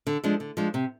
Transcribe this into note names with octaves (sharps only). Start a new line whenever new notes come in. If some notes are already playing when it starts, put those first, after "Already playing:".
D3
F3 G#3 D4
D3
F3 G#3 D4
C3